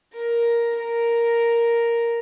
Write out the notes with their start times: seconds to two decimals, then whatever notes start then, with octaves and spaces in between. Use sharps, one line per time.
0.13 A#4
0.76 A#4